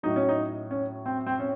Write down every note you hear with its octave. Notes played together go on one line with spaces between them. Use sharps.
A2 F#3 D#4
C#4
D#4
C#4
C4
C4
C#4